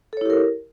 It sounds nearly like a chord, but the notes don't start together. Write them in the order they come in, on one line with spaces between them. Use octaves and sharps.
A4 C#5 E4 G4 A#4